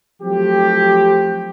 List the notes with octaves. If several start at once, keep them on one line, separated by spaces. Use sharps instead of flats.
F3 F#3 A3 C4 G4